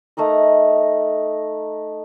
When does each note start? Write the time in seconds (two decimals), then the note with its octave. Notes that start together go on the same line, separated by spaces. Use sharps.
0.17 A3 D#4 A#4 D#5